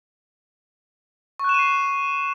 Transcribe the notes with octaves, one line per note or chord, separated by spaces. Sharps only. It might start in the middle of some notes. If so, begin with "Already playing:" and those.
C#6 F#6 C7 D#7 E7